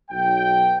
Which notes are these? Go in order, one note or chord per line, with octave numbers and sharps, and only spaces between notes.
B1 G5